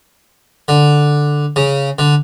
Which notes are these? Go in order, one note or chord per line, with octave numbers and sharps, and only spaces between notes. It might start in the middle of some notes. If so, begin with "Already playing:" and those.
D3
C#3
D3